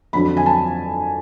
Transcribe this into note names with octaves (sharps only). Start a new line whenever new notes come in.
F2 D3 F#3 B5
G#5
A5